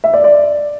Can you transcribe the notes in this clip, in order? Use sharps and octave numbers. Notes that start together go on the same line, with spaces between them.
E5
D5
D5